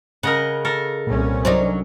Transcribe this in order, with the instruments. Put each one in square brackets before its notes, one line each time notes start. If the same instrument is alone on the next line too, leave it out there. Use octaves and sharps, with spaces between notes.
[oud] C#3 [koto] A#4 D#5 F#5
[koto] A4 A#4
[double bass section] C2 C#4 [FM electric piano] A#2
[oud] F#3 D4 D#4 [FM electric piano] C5 D5